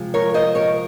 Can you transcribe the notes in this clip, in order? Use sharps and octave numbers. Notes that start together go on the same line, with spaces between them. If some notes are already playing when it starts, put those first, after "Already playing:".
Already playing: C3 F3 G#3
A#4 C#5
C5 D#5
A#4 C#5